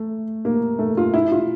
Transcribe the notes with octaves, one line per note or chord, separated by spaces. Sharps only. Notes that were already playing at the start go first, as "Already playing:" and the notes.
Already playing: A3
A#3
A3
F4
E4
F4